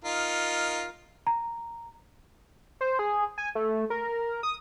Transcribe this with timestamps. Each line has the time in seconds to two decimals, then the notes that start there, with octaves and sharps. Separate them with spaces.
0.04 D#4 F4 A#4
1.27 A#5
2.81 C5
2.99 G#4
3.38 G#5
3.55 A3
3.90 A#4
4.43 D#6